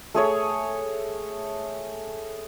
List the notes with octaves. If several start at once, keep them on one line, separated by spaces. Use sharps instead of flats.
A3 G#4 C#5